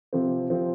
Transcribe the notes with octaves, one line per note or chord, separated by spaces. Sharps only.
C3 F3 C4
C3 F3 C4